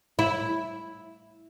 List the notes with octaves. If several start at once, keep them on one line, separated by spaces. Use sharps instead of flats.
E4